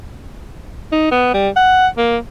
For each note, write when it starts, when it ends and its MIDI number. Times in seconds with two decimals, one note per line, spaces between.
0.92 1.08 63
1.11 1.33 59
1.34 1.49 55
1.56 1.87 78
1.98 2.17 58